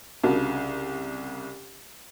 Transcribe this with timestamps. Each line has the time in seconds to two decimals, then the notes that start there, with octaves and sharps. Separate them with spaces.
0.24 C2 C#3 D4 F#4 A#4